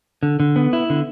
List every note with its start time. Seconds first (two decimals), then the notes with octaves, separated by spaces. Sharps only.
0.23 D3
0.40 D3
0.56 B3
0.73 E4
0.90 D3